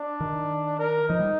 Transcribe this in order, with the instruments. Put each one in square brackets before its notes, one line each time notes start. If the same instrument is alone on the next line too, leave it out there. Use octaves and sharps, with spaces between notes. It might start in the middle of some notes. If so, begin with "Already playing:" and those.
Already playing: [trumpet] D4
[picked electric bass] D#3
[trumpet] A#4
[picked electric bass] F3 [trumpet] D#4
[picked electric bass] G3